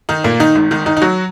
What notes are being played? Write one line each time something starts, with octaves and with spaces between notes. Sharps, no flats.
D#3 D#4
A#2 A#3
D#3 D#4
G#1 G#2 D#3
D#3 D#4
D#3 D#4
D#4
F#3 F#4